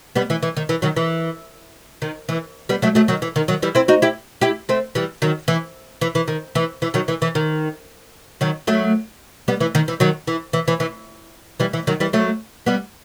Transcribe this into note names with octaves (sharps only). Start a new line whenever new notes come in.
G3 B3
E3
E3
D#3
E3
D#3 F#3
E3
D#3
E3
G3 B3
F#3 A3
F#3 A3
D#3 F#3
E3
D#3
D#3 F#3
E3 G3
C4 E4
D#4 F#4
E4 G4
E4 G4
A3 C4
E3 G3
D#3 F#3
E3
E3
E3
D#3
E3
E3
D#3 F#3
E3
E3
D#3
D#3 F#3
F#3 A3
G3 B3
E3
D#3
E3
D#3 F#3
E3
E3
E3
E3
E3 G3
E3
D#3 F#3
E3 G3
F#3 A3
G3 B3